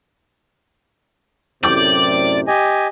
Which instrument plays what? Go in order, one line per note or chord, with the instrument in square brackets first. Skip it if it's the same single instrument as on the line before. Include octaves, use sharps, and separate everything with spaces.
[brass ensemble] F#2 A2 C3 [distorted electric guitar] D5 [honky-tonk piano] D6 G6
[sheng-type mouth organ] G4 D#5 G#5